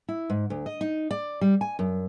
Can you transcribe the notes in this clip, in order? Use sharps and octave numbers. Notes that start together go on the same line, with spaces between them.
E4
G#2
D2
D#5
D#4
D5
G3
G#5
F#2